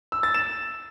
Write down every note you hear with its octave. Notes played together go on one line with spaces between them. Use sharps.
E6
A6
E7